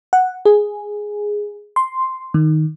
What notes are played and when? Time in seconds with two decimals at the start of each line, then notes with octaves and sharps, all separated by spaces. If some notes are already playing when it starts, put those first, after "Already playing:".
0.13 F#5
0.45 G#4
1.76 C6
2.34 D#3